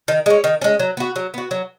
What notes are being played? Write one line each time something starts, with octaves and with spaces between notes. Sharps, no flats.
D#3
G#3 C#4
D#3
G#3 C#4
F#3
B3 F#4
F#3
B3 F#4
F#3